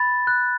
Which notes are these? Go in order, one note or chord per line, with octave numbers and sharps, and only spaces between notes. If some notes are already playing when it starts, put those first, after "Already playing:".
Already playing: B5 A6
F#6